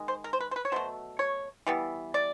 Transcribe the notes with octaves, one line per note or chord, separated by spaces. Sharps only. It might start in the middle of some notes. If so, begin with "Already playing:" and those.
Already playing: D#3 G#3
C5
A#4
C5
B4
C5
B4
C#5
B2 F#3 A3 C5
C#5
E3 G3 B3
D5